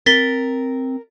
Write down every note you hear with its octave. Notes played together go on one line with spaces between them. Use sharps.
C4 A#4 A6 B6 G7